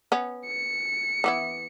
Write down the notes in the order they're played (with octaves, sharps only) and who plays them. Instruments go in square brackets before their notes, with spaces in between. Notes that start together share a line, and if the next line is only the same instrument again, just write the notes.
[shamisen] B3 C#4
[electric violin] C#7
[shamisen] E3 B3 E4